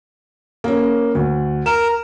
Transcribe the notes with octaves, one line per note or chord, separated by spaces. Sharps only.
A#3 C#4
D2
A#4 E7